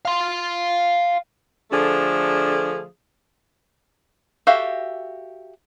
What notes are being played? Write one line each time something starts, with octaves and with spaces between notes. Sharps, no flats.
F5 C6
D3 F3 A3 D4 G#4
F#4 G4 A4 E5 F5